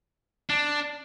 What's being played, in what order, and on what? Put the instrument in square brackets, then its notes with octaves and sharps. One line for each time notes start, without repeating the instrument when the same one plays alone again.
[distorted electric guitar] D4